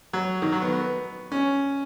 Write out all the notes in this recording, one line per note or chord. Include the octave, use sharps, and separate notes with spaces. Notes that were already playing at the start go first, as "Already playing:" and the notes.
F#3
D#3
F#3
B3
B3
C#4